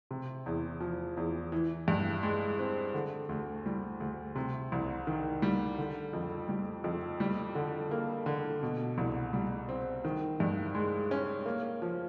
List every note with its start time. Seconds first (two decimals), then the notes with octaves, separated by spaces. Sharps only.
0.11 C3
0.46 E2
0.80 F3
1.17 E2
1.52 E3
1.88 G2
2.23 G#3
2.59 C4
2.94 D3
3.29 D2
3.66 G3
4.00 D2
4.35 C3
4.72 C2
5.07 D#3
5.42 G3
5.78 D3
6.13 F2
6.49 G3
6.84 F2
7.20 G3
7.55 D3
7.91 A#3
8.26 D3
8.63 B2
8.98 C2
9.33 G3
9.69 C4
10.05 D#3
10.40 G2
10.75 G#3
11.11 C#4
11.46 A#3
11.82 F3